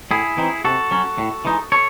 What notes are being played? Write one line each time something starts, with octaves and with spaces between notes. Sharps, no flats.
A2 E4 G#4
E3 C4 D#4
C3 F#4 A4
F#3 C#4
A2
E3 G#3 D#4
A4 C#5